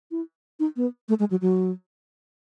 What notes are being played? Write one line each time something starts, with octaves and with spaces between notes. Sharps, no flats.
E4
D#4
B3
A3
G#3
F#3
F#3